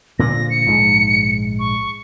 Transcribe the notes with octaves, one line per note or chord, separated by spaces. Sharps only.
A#2 D3 F3 A#6
C#7
A#1 G#2 G#3
C#6